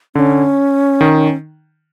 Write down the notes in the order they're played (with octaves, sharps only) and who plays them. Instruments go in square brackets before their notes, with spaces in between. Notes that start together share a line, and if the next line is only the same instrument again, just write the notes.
[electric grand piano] D3 [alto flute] C#4
[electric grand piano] D#3